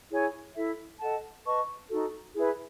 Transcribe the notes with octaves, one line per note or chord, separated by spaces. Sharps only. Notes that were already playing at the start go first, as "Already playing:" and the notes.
E4 G#4 C#5 G#5
E4 A4 E5
A4 D#5 F#5 A5
B4 D#5 A5 C#6
D#4 F#4 A4
E4 G#4 B4 E5